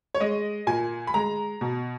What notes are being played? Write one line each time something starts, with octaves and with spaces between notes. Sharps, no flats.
C#5
G#3 D#5
A#2 G#5
B5
G#3 A#5
B2